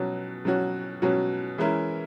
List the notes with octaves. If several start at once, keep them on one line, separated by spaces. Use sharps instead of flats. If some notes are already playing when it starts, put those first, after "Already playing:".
Already playing: B2 F#3 C#4 F#4
B2 F#3 C#4 F#4
B2 F#3 C#4 F#4
E3 G#3 C#4 E4 A#4